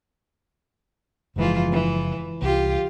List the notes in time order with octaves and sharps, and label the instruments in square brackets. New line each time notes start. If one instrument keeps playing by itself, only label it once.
[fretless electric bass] F#1 F3 [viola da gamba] G#2 E3 F4
[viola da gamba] E3
[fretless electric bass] C2 [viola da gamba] F4 G4